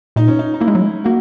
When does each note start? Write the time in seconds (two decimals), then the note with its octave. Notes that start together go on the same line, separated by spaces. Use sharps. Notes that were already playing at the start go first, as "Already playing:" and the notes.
0.16 A#2 D#4
0.28 C#4
0.39 D#4
0.54 D#4
0.60 A#3 E4
0.68 G#3
0.75 F#3
0.82 G#3
1.04 A#3 F#4